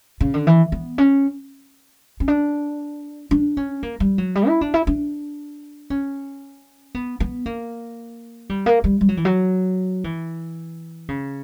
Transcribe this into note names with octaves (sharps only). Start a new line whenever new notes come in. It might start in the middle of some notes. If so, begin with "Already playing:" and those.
C#3
D3
E3
B3
C#4
C#4
D4
D4
C#4
A#3
G3
F#3
G3
E4
D4
E4
D4
C#4
B3
B3
A#3
G3
A#3
G3
G3
F#3
E3
F#3
E3
C#3